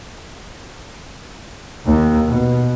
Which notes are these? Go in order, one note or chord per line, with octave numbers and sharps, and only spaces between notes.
D#2
B2